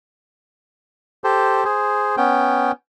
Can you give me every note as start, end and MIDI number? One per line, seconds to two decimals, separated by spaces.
1.24 1.64 67
1.24 1.64 69
1.24 1.64 72
1.65 2.16 68
1.65 2.16 72
2.17 2.72 59
2.17 2.72 61
2.17 2.72 79